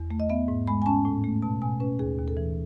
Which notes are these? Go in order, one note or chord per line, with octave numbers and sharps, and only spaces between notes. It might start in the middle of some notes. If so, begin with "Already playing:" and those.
Already playing: E2
A3
D#5
B3 E5
G#2
G#3 B5
G#5
C#4 A5
A2
A3
B2 A5
B2 G#5
C#4 B4
D#2 G#4
D#2
A4
E3